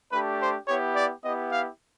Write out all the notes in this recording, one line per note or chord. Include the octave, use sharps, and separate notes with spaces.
A3 D4 G4 B4
C5
B3 E4 G4 C#5
D5
B3 E4 G4 D#5
F5